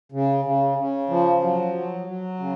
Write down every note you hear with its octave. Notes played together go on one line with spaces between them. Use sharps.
C#3
C#3
C#3
F3
F#3
F#3
F#3
C#3